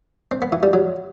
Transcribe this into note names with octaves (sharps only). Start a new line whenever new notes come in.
C4
B3
E3
G3
F#3